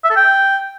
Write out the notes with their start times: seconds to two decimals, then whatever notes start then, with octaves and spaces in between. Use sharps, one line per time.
0.04 E5
0.10 A4
0.16 G5